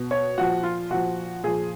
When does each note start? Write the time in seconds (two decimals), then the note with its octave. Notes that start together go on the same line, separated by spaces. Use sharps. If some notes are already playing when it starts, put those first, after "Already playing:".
Already playing: B2
0.11 C#5
0.38 A#2 F3 F#4
0.63 F4
0.90 A#2 F3 F#4
1.44 A#2 F3 G#4